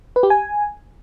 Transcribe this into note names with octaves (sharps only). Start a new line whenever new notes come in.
B4
G4
G#5